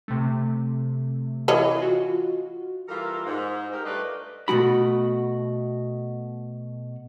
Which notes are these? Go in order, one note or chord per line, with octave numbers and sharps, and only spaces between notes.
C3 A3
E3 C#5 D#5
F4 F#4
E3 G3 A#3 F4 A4 A#4
G#2
G4 A#4
G2 A3 F4 B4 D5 D#5
B2 A3 F#4 B5